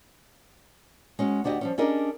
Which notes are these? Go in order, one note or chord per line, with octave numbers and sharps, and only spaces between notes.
G#3 C#4 F#4
D2 D4 F#4 G4 D#5
F3 G3 C#4
C#4 D4 G4 G#4 A#4 D#5